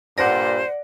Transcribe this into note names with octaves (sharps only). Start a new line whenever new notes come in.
G2 A#2 C5 D5 F#5 A#6